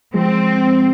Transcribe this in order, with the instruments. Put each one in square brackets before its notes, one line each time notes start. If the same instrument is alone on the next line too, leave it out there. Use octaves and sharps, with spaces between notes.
[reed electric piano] F3 G#3 [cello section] C4